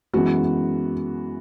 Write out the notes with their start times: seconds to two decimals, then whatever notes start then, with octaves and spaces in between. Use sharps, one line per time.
0.13 F#2 E3 G#3 B3 F#4